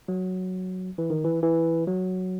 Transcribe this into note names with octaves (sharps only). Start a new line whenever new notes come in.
F#3
E3
D#3
E3
E3
F#3